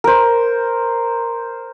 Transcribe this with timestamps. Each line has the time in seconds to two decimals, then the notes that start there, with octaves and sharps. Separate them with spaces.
0.04 A#4 C5